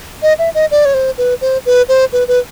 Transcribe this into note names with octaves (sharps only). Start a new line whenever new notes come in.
D#5
E5
D#5
D5
C#5
C5
B4
C5
B4
C5
B4
B4